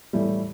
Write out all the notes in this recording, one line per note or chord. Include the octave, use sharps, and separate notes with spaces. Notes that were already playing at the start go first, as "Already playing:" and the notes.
A2 E3 G3